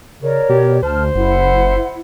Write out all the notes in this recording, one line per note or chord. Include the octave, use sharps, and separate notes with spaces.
C#3 A#4 C#5 D5
B2 G4
D2 C5 A5 F6
F#1 E4 F#5